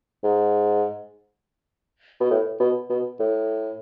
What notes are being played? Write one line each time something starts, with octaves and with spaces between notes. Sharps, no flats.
G#2
B2
A2
B2
B2
A2